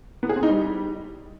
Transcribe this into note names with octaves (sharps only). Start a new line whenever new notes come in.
B3
G#4
C4
D#4
G3